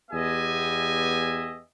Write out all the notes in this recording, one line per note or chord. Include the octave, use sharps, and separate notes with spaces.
E2 B3 G4 D#5 E5 G#5